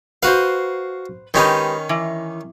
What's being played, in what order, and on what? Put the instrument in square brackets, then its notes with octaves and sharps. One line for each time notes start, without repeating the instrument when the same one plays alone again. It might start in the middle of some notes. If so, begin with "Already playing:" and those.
[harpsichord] F#4 F5 [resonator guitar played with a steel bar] B4 C5
[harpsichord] D#3 C#4 D#4 [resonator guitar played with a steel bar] G#3 G4 B4
[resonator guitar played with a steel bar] E3